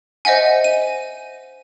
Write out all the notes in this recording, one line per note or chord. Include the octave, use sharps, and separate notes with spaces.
C5 D#5 E5 F#5 G#5
D#7